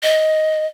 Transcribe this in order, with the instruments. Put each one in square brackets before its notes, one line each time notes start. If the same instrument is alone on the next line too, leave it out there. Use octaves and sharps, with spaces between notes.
[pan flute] D#5